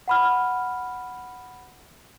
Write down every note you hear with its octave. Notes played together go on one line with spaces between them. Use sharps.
F#5 B5 F6